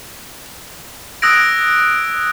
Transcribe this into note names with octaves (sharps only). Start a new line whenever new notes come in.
D#6 E6 F#6 G#6 A#6 D7